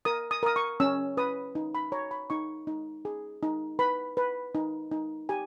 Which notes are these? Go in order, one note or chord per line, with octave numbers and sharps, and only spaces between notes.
A#4 D#6
D#6
A#4 D#6
C#6
C#4 E6
B4 D#6
D#4
B5
C#5 A#5
B5
D#4 C#6
D#4
G#4
D#4
B4 B5
B4
D#4
D#4
G4 G#5